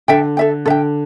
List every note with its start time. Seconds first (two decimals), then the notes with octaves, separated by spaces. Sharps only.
0.08 D3 A4 E5 G5
0.37 A4 E5 G5
0.66 D3 A4 E5 G5